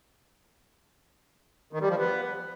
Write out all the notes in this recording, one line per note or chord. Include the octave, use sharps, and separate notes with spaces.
D#3
G3
F3
B3